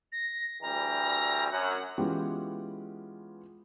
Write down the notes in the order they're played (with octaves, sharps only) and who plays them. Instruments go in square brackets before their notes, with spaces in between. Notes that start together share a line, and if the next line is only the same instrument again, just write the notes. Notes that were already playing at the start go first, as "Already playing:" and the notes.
[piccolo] A#6
[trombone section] D2 E3 G3 [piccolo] A#5
[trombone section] F#2 [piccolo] F#5
[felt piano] E3 G#3 B3 C#4 F4 G4